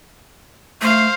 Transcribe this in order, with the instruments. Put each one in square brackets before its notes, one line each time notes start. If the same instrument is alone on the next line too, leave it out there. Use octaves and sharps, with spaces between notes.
[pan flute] A3 [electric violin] C5 F5